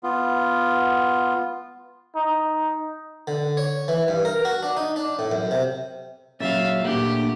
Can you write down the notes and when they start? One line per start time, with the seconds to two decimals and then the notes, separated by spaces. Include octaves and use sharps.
0.03 B3 F4
2.15 D#4
3.27 D3
3.57 C#5
3.88 E3
4.08 G2
4.25 A#4
4.45 F#4
4.63 D4
4.77 D#4
4.96 D4
5.19 A2
5.32 F#2
5.51 C3
6.40 A#2 C#3 F#3 C#5 E5 F5 A6
6.84 A#2 A3 A#3 D4 G4 F#5